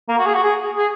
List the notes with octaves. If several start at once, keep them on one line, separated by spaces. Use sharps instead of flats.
A#3
F#4
G#4
F#4
G#4
G#4